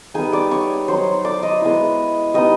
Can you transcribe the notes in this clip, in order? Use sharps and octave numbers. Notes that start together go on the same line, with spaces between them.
G3 B3 D#4 G#4 G#5
D5 D6
C#5 C#6
F#3 B3 D#4 C5 C6
D5 D6
D#5 D#6
G#3 B3 E4
G3 B3 D#4 D#5 D#6